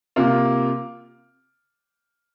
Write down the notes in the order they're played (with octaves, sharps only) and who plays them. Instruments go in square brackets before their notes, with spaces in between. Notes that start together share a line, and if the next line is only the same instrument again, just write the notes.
[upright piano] C3 A#3 F4